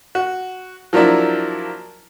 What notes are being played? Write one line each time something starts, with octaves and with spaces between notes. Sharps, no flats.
F#4
F3 F#3 A#3 D4 E4